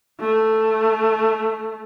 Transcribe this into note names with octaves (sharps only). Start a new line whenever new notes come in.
A3